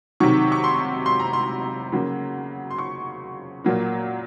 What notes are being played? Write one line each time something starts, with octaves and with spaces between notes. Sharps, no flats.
C3 D#3 F#3 C#6
C#6
C6
C6
A#5
C6
C#3 F#3 A#3
C6
C#6
A#2 F#3 A#3